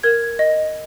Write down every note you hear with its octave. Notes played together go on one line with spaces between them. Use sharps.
A#4 G#6
D#5